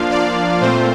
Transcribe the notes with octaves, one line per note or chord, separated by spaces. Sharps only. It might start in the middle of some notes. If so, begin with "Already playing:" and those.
Already playing: F3 A#3 D4 F4 F5
D5
A#2 A3 C4 F4 C5